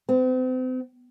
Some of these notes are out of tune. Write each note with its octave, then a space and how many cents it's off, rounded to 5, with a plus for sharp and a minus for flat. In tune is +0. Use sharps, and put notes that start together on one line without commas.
C4 -40